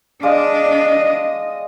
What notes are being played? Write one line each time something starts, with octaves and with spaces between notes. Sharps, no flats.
G#3 D4 D5 D#5 F5